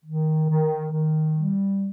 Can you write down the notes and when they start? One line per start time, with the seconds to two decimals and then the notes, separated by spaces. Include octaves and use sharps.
0.04 D#3
0.49 D#3
0.92 D#3
1.35 G3